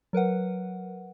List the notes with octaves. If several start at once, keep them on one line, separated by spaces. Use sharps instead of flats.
F#3 A#4 B4 F#5